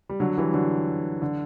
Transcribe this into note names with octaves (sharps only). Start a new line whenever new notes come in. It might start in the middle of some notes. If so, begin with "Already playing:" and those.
G3
D3 F#3
E3 G3
D3 F#3
D3